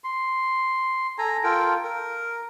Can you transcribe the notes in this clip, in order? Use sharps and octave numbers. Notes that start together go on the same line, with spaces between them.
C6
A4 G#5 A#5
F4 A4 A#4 G5
A#4